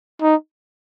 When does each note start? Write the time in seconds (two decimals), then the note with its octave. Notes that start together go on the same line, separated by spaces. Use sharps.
0.22 D#4